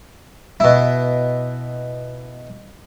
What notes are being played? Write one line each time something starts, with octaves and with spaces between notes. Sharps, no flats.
B2 E4